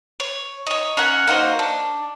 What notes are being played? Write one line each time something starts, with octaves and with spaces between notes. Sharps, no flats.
C#5
D#4 C#5
C#4 A#4 F#5
A#3 D#4 F#4 C5
D4